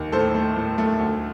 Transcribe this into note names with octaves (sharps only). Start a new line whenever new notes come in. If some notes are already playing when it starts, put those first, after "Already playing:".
Already playing: D#2
A2 A4 C5
A3
A2
A3
D2